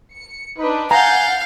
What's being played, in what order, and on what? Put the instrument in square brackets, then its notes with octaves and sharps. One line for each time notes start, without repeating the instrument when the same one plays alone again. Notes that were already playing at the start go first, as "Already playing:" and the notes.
[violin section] C#7
[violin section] D4 B4 [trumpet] D#4
[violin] F5 [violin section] F#5 G6 A6 [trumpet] G#5 [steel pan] A#5